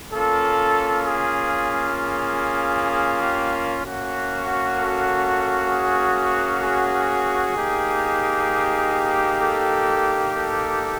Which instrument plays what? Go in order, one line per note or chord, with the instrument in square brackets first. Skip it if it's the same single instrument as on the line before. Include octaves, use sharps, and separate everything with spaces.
[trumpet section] A#3 C#4 F4 A4
G#4
G#4
G#4
G4
A#3 C#4 F#4
A4
G#4
G#4
A#3 D#4 G4
A4
A4